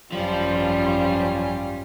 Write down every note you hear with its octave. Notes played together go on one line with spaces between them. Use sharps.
G#1 F#2 F3 G3 C#4 F4